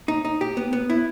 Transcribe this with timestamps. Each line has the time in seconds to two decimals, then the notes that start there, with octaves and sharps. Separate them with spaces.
0.08 D#4
0.25 D#4
0.41 G4
0.57 B3
0.73 B3
0.90 E4